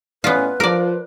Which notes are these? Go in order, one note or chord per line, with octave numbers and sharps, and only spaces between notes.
A2 B3 C#4 F4 B4 D5
F3 A#4 D5